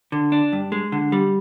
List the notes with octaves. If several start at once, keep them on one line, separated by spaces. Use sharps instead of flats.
D3
D4
G2
G#3
D3
G3